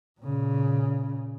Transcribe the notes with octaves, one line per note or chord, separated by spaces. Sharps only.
A#2 C#3